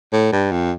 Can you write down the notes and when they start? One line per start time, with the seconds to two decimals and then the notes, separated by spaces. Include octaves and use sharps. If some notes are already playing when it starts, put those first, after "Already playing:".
0.13 A2
0.32 G2
0.51 F2